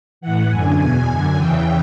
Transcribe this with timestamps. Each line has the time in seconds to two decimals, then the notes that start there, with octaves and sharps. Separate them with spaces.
0.21 A2 E3 F#5
0.50 F#2 D3 G#5
0.78 E2 B2 G#5
1.08 F#2 D3
1.36 E2 C#3 E3 G5